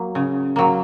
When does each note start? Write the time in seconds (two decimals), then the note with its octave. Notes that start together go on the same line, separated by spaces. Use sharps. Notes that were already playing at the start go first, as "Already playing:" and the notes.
Already playing: F#3 A#3
0.15 C#3
0.56 F#3 A#3